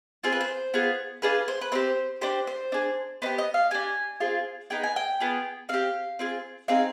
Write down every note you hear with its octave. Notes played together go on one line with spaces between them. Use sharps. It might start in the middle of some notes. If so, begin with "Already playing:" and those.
C4 F4 G#4 C5
B4
C5
B3 F4 G#4
D4 F4 G#4 B4
C5
B4
C4 D#4 G4 C5
D4 G4 C5
C5
D4 G#4
B3 D#4 G4 C5
D#5
F5
D4 G4 G#5
C4 F4 G#4
B3 D#4 G#4 G5
G#5
G5
B3 F4 G#4
C4 G4 F5
C4 F4 G#4
C4 D#4 G#4 F5